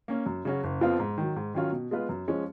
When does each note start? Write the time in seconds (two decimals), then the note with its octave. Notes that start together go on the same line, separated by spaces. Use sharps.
0.08 A#3 C#4
0.26 F#2
0.45 C#3 F#3 C#4 F#4
0.64 F#1
0.81 F2 F3 B3 F4
1.00 G#2
1.18 D#3 F#3
1.36 G#2
1.54 D#3 F#3 C#4 F4
1.72 B2
1.91 G#3 B3 F4 B4
2.09 F#2
2.28 F3 G#3 C#4